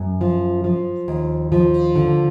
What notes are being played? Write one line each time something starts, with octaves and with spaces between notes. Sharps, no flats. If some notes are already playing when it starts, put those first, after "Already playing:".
Already playing: F#2
F3
F3
D#2
F3
D3